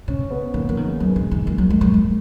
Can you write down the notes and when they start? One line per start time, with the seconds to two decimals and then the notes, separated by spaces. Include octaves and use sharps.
0.08 C#3 C#4
0.31 B3
0.54 D#3 A#3
0.69 F3 A#3
0.77 D#3
0.84 G#3
1.00 F#3 G#3
1.16 D#3
1.31 D#3
1.47 F3 A#3
1.58 F#3
1.70 G#3
1.81 F#3
1.94 G#3